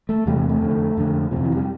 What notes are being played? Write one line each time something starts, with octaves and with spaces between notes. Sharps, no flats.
A3
E2 C3 G3
A3
A3
F2 D3
F2 D3
F2 C3 F3
E3
G3